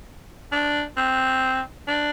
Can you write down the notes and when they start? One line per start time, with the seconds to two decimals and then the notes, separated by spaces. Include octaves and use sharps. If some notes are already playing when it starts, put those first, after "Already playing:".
0.52 D4
0.97 C4
1.88 D4